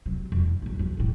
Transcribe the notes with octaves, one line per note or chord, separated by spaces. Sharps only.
C3 F#3
F2
D#2
A#1 F#2
F#2 F3
E2 A2